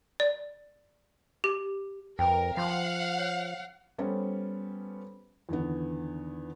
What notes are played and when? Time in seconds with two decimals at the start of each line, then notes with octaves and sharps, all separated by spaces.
0.20 D5
1.44 G4
2.19 F2 A#4 B4 G5
2.57 F3 F5 F#5 B5 C6
3.18 C#5
3.98 G3 B3 C#4 A4 C5
5.49 E2 D3 D#3 B3